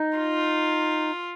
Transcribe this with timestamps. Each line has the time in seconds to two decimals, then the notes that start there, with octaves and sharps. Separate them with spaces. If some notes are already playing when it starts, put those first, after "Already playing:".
Already playing: D#4
0.18 F4